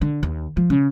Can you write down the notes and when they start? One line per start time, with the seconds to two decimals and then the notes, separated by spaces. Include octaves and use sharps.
0.02 D3
0.23 D#2
0.57 F3
0.70 C#3